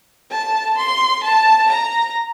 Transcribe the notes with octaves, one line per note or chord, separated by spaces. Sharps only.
A5
C6
A5
A#5